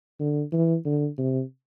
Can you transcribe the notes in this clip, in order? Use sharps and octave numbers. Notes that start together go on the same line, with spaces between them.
D3
E3
D3
C3